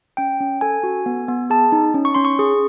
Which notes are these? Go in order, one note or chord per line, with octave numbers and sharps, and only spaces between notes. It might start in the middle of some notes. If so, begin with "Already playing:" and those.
C#4 G5
C#4
A4 G#5
F#4
B3
B3
G#4 A5
D#4
C#4
C#6
C#4 C6
C#6
G#4